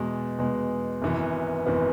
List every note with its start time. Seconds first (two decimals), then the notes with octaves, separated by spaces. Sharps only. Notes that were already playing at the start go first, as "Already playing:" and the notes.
Already playing: E2 B2 G#3
0.38 E2 B2 G#3
1.02 G#1 F#2 E3 B3
1.66 G#1 F#2 E3 B3